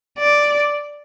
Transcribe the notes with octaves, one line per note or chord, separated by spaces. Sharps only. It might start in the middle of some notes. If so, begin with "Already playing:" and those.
D5